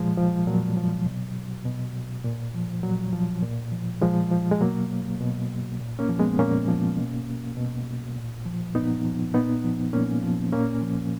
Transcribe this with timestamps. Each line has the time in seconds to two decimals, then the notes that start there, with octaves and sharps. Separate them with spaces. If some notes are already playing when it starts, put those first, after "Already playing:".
Already playing: A#2 F3 G#3
0.18 F3
0.47 A#2 F#3
0.77 F3
1.06 B2
1.65 B2
2.24 A#2
2.54 F3
2.83 A#2 F#3
3.13 F3
3.43 A#2
3.72 F3
4.02 A#2 F3 G#3
4.31 F3
4.51 G#3
4.61 B2 F#3 A#3
5.21 B2
5.79 A#2
5.99 A#3 C#4
6.09 F3
6.19 G#3 B3
6.39 A#2 A#3 C#4
6.68 F3
6.97 B2
7.57 B2
8.16 A#2
8.45 F3
8.75 A#2 B3 D#4
9.04 F3
9.34 A#2 B3 D#4
9.64 F3
9.93 A#2 A#3 C#4
10.23 F3
10.52 A#2 A#3 C#4
10.82 F3